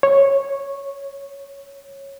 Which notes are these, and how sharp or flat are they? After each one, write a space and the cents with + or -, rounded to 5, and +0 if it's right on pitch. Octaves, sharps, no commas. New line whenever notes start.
C#5 -10